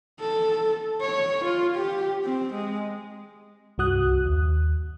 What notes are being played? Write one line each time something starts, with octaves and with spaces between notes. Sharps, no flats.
A4
C#5
F4
G4
C4
G#3
C2 G2 F#4 D#6 F#6
D#2